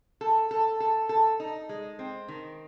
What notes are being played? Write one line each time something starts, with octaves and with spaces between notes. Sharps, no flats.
A4
A4
A4
A4
D#4
G#3
C4
D#3